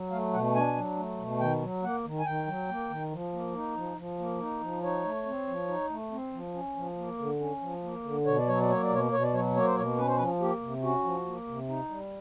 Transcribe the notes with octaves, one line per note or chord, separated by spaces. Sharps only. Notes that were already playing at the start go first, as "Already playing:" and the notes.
Already playing: F#3
A3 F5
B2 F#5
D4 G#5
F#3
A3
B2
D#3 G5
F#3
A#3 F#5
D#3
G#5
D#3 G5
F#3
A#3
D#3
F3
A#3
D#4
F3
F3
A#3
D#4
F3
D#4 C#5
A3
C4
F3
D#4
A3
C4
F3
C#4
F3
A#3
D3
C#4
F3
A#3
D3
B2 C#5
D5
F#3 C#5
D5
A#3 C#5
D5
B2 C#5
B2 C#5
D5
F#3 C#5
A#3 C#5
C5
B2 C#5
C#4 B4
C5
F3 B4
A#3 G4
C3
C#4 F#4
F3
A#3
C3
D#4
G3